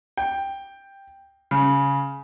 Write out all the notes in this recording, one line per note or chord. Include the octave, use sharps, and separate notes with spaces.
G5
C#3